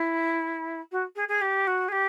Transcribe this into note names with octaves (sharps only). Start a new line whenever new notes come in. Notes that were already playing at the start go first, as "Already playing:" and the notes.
Already playing: E4
F#4
G#4
G#4
G4
F#4
G#4
G4